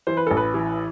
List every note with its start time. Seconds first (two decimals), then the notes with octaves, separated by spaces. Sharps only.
0.07 E3 C5
0.17 B4
0.27 A1 A4
0.37 B4
0.54 E3